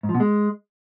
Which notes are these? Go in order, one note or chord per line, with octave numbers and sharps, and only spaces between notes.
G#2
F3
B2
G#3